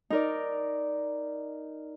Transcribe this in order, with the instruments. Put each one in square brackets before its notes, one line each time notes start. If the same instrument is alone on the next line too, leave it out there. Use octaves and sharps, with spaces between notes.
[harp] D#4 A#4 D5